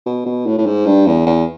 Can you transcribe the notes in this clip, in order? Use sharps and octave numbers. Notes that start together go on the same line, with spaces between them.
B2
B2
A2
A2
G#2
G2
E2
E2